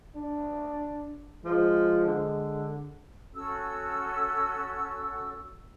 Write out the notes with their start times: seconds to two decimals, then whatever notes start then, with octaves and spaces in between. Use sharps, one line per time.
0.16 D4
1.45 F3 G#3
2.07 D3
3.34 C#4 F#4 A4 E6